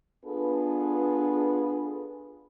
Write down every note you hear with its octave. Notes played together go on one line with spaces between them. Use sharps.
B3 D4 F4 G#4 A4 B4